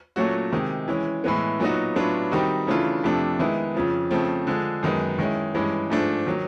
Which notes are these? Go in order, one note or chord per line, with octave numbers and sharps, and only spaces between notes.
A#2 F#3 A3 C#4 F#4
C3 D#3 G#3
E3 G#3 C#4
A2 E3 G#3 B3
A#2 F#3 B3 D#4 F#4
A2 F#3 B3 D4 F4
D#3 G3 C4 D#4 F#4
C#3 E3 A3 D4 F4
F2 C3 F3 A3 D4
D#3 G#3 B3 E4
F2 C#3 F3
C#3 F3 A3 C4
D3 F3 G#3
F#2 D#3 G#3 B3
D#3 G#3 C#4 E4
G2 E3 G#3 C#4
G#2 F3 A3 D4
D#3 F#3